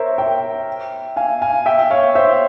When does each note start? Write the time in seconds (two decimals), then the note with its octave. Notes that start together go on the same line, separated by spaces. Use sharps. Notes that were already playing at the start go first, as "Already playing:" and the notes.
Already playing: A#4 C5 C#5 E5
0.18 E5 G5
1.16 F5 G#5
1.42 F5 G#5
1.66 E5 G5
1.90 C#5 F5
2.15 C5 E5